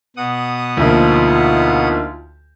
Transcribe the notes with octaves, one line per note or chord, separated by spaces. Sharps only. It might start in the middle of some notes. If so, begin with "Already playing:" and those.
B2 F#5 D#6
D2 F3 A#3 D#4 F4